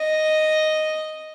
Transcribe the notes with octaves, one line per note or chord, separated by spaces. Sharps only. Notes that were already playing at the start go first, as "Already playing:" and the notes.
Already playing: D#5